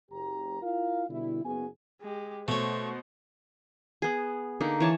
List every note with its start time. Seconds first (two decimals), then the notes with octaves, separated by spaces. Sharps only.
0.11 F#1 G4 A#5
0.62 E4 F4 A#4 F5
1.10 B2 D3 G3 E4
1.45 F#1 B3 F#4 G#4 G#5
2.01 G#3 G4
2.48 B2 A3 C5 C#5
4.02 B3 G#4
4.61 D3 A#3 D#4
4.80 E3 C#5 A5